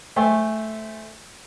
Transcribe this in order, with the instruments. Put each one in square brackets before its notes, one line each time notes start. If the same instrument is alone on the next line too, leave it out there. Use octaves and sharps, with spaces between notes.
[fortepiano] A3 A4 C5 G5 G#5